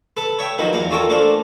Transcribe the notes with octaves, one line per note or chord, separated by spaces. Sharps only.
A4 B4 A5
C#5 E5 G5
D#3 F3 F#3 A#3 B3 D#4
E2 A#3 F5 F#5
C#4 F4 F#4 A4 A#4 G5
A3 A#3 D4 C5 F5